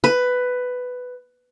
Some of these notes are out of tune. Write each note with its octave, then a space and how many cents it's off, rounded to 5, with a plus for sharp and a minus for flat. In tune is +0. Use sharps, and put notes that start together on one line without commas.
B4 +10